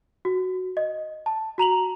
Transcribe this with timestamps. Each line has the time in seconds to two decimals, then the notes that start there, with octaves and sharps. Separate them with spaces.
0.25 F#4
0.77 D#5
1.26 A5
1.58 F#4 A#5 F7 F#7